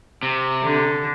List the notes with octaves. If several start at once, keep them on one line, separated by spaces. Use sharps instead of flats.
C3
D3